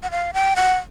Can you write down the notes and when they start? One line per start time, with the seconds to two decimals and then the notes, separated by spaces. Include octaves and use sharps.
0.03 F#5
0.11 F5
0.34 G5
0.56 F#5